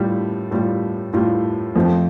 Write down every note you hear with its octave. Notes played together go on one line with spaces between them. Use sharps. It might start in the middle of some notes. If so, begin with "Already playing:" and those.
Already playing: A2 G3 F4
A2 G3 F4
A2 G3 F4
F2 F3 A3 C4 F4